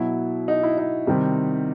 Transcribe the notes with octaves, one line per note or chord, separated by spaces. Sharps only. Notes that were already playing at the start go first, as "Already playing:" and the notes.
Already playing: B2 F#3 E4
D#4
E4
D#4
C3 D#3 G3